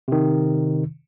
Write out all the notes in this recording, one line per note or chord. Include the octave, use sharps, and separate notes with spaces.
C3 D#3